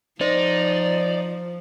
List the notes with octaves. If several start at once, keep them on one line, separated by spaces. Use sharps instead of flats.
F3 D#4 C5 D5